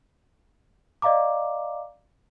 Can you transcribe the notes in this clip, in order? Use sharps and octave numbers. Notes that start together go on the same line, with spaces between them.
D5 D#5 F5 A#5 D6